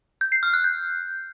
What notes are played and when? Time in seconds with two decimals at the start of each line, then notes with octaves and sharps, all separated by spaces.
0.21 G6
0.32 C7
0.43 F6
0.54 F#6
0.64 G6